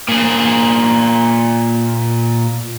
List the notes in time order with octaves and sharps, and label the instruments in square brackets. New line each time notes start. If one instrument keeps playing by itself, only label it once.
[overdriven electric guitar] A#2 G#4